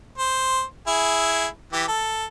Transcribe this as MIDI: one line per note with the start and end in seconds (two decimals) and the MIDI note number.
0.18 0.62 72
0.87 1.46 64
0.87 1.46 68
1.73 1.84 52
1.73 1.84 67
1.88 2.25 69